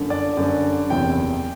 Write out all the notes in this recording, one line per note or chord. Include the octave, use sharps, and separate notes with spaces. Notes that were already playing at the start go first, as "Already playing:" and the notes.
Already playing: G1 F#2 D3
D5
G1 F#2 D3
F#1 E2 C3 E3 G5